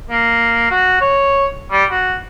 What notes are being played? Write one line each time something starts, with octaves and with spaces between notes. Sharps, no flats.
A#3
F#4
C#5
G3
F#4